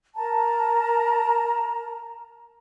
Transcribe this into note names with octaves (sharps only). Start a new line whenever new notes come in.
A#4 A5 A#5